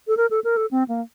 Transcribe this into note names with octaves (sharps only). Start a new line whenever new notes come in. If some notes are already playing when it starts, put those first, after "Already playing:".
A4
A#4
A4
A#4
A4
C4
A#3